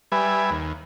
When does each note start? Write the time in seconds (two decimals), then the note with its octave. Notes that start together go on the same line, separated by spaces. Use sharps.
0.12 G3 B4 E5 G#5
0.51 D#2